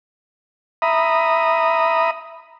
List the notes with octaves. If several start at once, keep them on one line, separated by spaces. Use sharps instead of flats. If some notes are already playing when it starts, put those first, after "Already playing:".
E5 A#5 B5 D#6